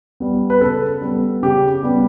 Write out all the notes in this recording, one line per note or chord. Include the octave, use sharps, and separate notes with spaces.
G3 B3
B4
C#3 A4
G3 B3
C#3 G4
G3 B3